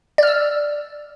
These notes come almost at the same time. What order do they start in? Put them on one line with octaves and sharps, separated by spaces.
D5 F6 E6